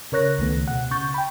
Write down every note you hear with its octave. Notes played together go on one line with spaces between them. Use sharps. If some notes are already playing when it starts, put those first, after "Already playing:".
C#3 A#4 C#5 F#6 A#6
C#2 D#3 A3 B3
B2 F#5
C#3 C#6 G6 A6
G5 B5